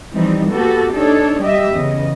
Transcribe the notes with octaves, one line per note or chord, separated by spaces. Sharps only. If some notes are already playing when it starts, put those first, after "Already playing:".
E3 F3 G3 C4 D#4
A#3 B3 F#4 G4 A4
D4 D#4 A4 C#5
G3 G4 D#5 E5
E2 C#3 D#5